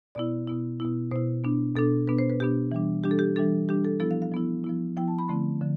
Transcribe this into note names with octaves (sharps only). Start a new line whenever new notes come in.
B2 B3 E4 D5
B2 B3 E4
B2 B3 E4
B2 B3 E4 C5
B2 B3 D4
B2 B3 D4 A4
B2 B3 D4 B4
C5
B4
B2 B3 D4 G4
E3 G3 D4
E3 G3 D4 G4
A4
G4
E3 G3 D4 A4
E3 G3 D4 G4
A4
F3 B3 E4 A4
F5
F5
F3 B3 E4
F3 B3 E4
F3 B3 E4 G5
A5
B5
D3 F3 A3 C4 E4 C6
D3 F3